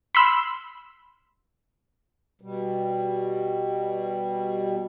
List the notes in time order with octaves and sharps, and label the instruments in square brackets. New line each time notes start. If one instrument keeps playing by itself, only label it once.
[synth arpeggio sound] B5 C6 E6
[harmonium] B2 G3